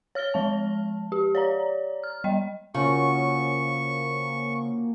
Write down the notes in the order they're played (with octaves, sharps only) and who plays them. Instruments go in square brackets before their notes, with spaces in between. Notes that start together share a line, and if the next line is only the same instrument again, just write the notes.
[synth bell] C#5 F6 A#6 G7
F3 G#3 A5
G4
C#5 D5 A#5
F6
G3 D#5 G5
[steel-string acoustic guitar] C#3 [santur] F3 C#4 F#4 [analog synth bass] A#3 [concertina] C#6